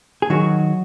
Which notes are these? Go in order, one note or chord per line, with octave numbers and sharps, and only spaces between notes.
G#4
D#3 F#3 F#4